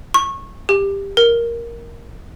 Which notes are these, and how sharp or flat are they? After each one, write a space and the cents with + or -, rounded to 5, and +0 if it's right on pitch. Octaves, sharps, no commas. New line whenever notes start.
C#6 -20
G4 +15
A#4 +5